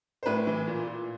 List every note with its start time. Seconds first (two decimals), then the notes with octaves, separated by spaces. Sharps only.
0.23 C5
0.26 A2 B4
0.47 E3
0.67 A#2
0.87 A#2